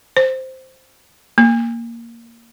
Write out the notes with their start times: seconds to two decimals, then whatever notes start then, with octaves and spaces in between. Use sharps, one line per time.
0.17 C5
1.38 A#3